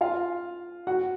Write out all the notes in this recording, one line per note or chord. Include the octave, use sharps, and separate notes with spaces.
F4 F5
F#4 F#5